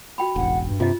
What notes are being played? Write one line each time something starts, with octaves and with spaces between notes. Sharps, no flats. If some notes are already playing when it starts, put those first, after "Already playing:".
F#4 G5 B5
E1 A1 F#5
G2
C3 F4 D#5